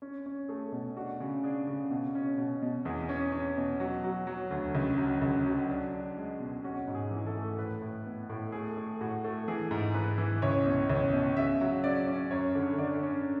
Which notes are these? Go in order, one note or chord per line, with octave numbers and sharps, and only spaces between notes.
C#4
C#4
A3 G#4
B2
D4 F#4
C#3
D4 G#4
C#3
B2
C#4
B2
B2
E2 G#4
C#4
C#4
B2
F#3
F#3
F#3
D2
C#2
F#3
C#2
F#3
D4
D4
G#3
B2
C#4 F#4
G#2
G#4
E3
A4
A3
A2 B4
A2
B3
A2
A3 G#4
A3
A2 F#4
A3
E3 G#4
G#2
G#2 B4
E3
C#2 C#5
B2
C#2 C#5
B2
C#3 E5
F#3
C#4 D5
C#4
F#2 C#5
D3
D3 D5
C#4